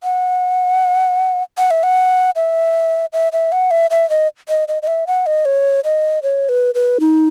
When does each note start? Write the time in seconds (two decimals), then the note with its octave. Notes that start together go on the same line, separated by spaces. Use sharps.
0.04 F#5
1.58 F#5
1.71 E5
1.83 F#5
2.36 E5
3.13 E5
3.33 E5
3.52 F#5
3.71 E5
3.91 E5
4.10 D#5
4.49 D#5
4.68 D#5
4.82 D#5
4.87 E5
5.07 F#5
5.26 D#5
5.45 C#5
5.84 D#5
6.23 C#5
6.49 B4
6.75 B4
7.00 D#4